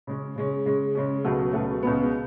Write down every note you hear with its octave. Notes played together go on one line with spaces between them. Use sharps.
C#3 G#3 C#4
C#3 G#3 C#4
C#3 G#3 C#4
C#3 G#3 C#4
C#2 B2 F#3 A3
C#2 B2 F#3 A3
C#2 B2 G#3 B3